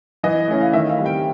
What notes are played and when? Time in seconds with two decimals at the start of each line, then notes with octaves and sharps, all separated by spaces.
0.23 E3 D#5
0.48 A3 C#4 E4
0.61 F5
0.73 D#3 E5
0.89 F5
0.99 G3 C4
1.06 G5